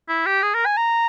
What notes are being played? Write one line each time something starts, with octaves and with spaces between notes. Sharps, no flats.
E4
G4
G#4
A#4
G#5
A#5